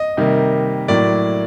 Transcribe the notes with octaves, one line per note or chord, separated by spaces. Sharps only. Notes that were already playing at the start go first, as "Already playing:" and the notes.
Already playing: D#5
C3 D#3 G3 A#3
A2 F#3 A#3 D5